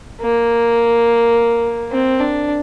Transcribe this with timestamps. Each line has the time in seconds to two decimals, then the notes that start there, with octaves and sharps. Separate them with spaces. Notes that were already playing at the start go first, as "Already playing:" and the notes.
0.21 A#3
1.92 C4
2.20 D4